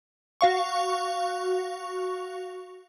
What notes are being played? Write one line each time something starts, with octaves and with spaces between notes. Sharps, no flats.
F#4 F5 C#6